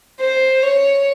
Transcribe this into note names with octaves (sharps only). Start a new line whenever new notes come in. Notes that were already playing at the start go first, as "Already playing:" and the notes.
C5
C#5